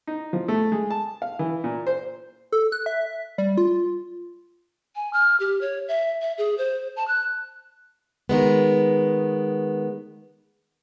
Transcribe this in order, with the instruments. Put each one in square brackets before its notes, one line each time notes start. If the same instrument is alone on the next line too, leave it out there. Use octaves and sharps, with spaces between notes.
[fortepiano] D#4
F3
A3
G#3
A5
F5
E3
A#2
C5
[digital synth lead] A4
F#6
E5
G3
F4
[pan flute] G#5
F6
G4
C#5
E5
E5
G#4
C5
A5
F#6
[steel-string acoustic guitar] D#3 G#3 B3